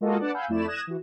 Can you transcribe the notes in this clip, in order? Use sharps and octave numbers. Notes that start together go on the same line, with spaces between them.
G#3 A#3 F4 F#4 A4 D#5
D4 B4 D5 F#5 A5
F5 F#5 G#5 B5 E6 G6
F2 A3 E4 D5 E7
D#6 F#6 G#6 A#6 E7
E3 F#4